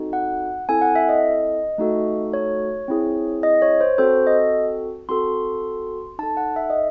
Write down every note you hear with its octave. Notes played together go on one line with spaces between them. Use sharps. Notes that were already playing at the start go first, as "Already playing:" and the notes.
Already playing: C4 D#4 F#4 A4
F#5
C4 E4 A4 G#5
F#5
E5
D#5
A3 D#4 F#4 A4
C#5
C4 E4 G#4
D#5
C#5
C5
C4 F#4 A4 C5
D#5
C4 F#4 A4 C6
D#4 A4 A5
F#5
E5
D#5